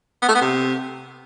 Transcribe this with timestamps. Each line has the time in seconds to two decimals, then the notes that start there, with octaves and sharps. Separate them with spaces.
0.22 B3
0.29 A3
0.35 B3
0.42 C3